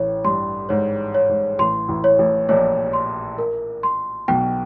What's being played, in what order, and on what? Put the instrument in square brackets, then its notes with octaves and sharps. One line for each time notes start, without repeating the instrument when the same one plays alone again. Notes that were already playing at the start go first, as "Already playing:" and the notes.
Already playing: [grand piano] A1 A2 [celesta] C#5
[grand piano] G2 [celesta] C6
[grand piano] G#2 [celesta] C#5
[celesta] C#5
[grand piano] G#2
[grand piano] A1 A2 [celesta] C6
[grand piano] A1 A2
[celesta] C#5
[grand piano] A1 A2
[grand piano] A#1 A#2 [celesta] C#5
[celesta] C6
A#4
C6
[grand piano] B1 B2 [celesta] G5